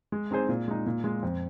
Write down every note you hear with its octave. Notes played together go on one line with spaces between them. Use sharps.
G#3
C4 D#4 G#4 C5
A#2
G#3 D#4
A#2
G#3 F4
F2